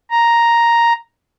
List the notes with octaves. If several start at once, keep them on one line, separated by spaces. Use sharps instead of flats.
A#5